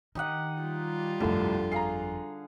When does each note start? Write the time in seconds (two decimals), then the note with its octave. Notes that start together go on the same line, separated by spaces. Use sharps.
0.15 D#3 D#4 G4 F#5
0.61 G3 F4
1.20 G1 C2 F2 A2 D3
1.72 G#4 F5 F#5 A#5 C7